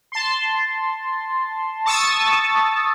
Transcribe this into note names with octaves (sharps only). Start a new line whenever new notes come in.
A5 C6
A5 C#6 D#6 E6 A6